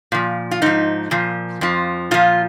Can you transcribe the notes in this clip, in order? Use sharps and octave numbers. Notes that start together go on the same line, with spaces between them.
A#2 F3
F4
G#2 F3 D#4
A#2 F3
F2 F3
A#2 F3 F4